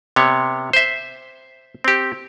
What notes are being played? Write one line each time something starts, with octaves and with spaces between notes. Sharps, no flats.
C3 B3 C#5
C5 E5
C4 G4